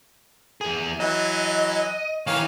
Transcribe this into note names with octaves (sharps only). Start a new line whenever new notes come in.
E2 G#4
E3 F#3 D#5
D#3 E3 C#5 F5